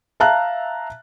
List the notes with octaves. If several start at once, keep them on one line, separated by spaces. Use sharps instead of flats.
E5 F5 A5 A#5 F#6